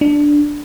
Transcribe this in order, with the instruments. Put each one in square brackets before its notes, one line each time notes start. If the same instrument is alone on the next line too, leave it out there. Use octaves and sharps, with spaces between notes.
[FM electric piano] D4